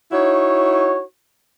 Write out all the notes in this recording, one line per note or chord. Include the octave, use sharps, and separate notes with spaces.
D#4 E4 F#4 C#5